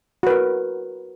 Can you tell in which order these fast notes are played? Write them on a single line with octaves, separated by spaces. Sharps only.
F#4 B4 A#4